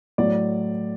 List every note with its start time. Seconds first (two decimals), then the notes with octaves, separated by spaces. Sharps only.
0.18 A2 F#3 D5